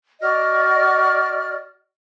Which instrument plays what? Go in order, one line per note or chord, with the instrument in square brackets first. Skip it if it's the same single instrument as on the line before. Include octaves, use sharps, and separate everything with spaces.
[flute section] F#4 D5 D#5 F6